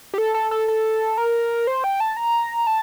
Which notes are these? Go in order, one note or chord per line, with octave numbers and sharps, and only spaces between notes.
G4
A4
A4
A4
A4
A#4
C5
G5
A5
A#5
A5